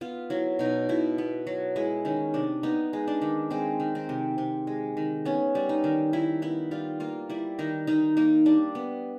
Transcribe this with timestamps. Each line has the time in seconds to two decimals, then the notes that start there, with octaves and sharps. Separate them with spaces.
0.01 B3 F4
0.30 F#3 E4
0.59 B2 D#4
0.89 B2 E4
1.18 B3
1.47 F#3
1.76 G#3 E4
2.05 D#3 C#4
2.34 C3 D4
2.63 B3 D#4
2.93 G#3
3.08 D4
3.22 D#3
3.51 G#3 C4
3.80 D#3
3.95 C4
4.09 C3
4.38 C3
4.67 G#3
4.97 D#3
5.25 B3 C#4
5.55 G3
5.69 D#4
5.84 D#3
6.13 D#3 E4
6.42 B3 E4
6.71 G3 F4
7.00 A#3 F4
7.29 G3 E4
7.59 D#3 D#4
7.87 D#3 D#4
8.17 A#3 D#4
8.46 G3 D4
8.75 B3